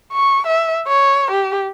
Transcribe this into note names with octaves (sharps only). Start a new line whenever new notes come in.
C#6
E5
C#5
G4